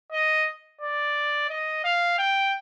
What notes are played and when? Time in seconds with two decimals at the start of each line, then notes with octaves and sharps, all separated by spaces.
0.12 D#5
0.81 D5
1.49 D#5
1.84 F5
2.18 G5